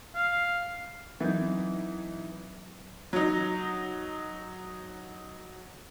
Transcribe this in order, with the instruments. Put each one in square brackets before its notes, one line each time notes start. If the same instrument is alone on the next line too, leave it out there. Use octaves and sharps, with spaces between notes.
[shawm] F5
[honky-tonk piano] E3 D#4 [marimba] F#3 C4 G6
[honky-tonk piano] F#3 D#4